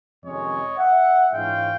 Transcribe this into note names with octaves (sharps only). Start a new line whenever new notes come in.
F2 C3 D#3 G#3 C#4 C#5 D#5
E5 F#5
G#2 E3 G#3 C#4 F4 F5 G5